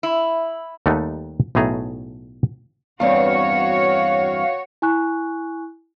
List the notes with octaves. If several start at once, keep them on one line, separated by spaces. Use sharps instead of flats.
E4
D#2 G3 A3 D#4 A4 F#5
B1 A2 A3 G#4 A#5
E2 G2 C4 F#4 C#5 F5
E4 G#5 C#6 F#6